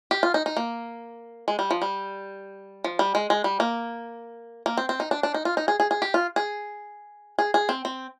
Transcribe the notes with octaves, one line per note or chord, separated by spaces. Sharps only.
G4
F4
D#4
D#4
A#3
G#3
G3
F3
G3
F3
G3
G#3
G#3
G3
A#3
A#3
C4
C4
D#4
D4
D4
D#4
F4
D#4
G#4
G#4
G#4
G4
F4
G#4
G#4
G#4
C4
C4